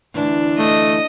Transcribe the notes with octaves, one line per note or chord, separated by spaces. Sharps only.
D2 E3 D4
A3 D#5